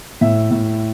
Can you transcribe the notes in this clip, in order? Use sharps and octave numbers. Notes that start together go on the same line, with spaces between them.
A2 E5
A2